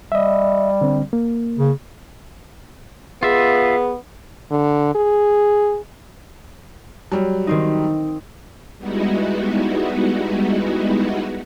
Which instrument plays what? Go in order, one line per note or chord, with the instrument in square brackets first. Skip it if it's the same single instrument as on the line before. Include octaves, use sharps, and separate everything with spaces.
[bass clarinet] G3 [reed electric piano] D#5 E5
[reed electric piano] D3 C4
A#3
[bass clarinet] C#3
[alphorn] B3 [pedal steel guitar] F4 E5 [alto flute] G#4
[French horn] D3
G#4
[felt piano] F#3 G3
[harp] D#3 C4 D#4
[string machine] G3 G#3 B3 D#4 E4 F#4